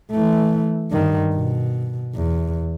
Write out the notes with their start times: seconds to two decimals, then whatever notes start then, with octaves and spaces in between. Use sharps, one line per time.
0.11 E3 A3
0.91 G2 D#3
1.35 B2
2.15 E2